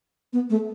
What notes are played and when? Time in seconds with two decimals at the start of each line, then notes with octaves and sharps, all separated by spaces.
0.33 B3
0.50 A3